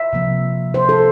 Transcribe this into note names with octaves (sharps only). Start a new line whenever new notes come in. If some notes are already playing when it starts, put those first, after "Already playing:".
Already playing: E5
C3 F3 A#3
C5
A4